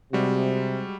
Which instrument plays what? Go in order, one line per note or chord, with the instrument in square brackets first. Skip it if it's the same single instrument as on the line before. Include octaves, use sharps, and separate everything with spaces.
[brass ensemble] C3 [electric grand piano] G3 G#3 F#4